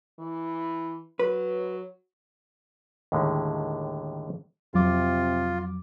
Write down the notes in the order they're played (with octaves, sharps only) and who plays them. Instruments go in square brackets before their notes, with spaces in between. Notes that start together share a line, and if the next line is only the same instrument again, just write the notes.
[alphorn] E3
[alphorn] F#3 [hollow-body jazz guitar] B4
[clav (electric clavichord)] D#2 A2 D3 D#3 G#3
[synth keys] F2 F#3 D6 [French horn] C3 [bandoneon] F4